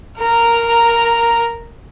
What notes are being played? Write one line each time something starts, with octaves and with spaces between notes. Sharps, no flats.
A#4 A#5